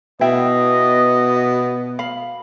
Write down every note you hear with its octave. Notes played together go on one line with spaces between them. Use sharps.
B2 B3 E4 D#5 E5 G5
F5 B5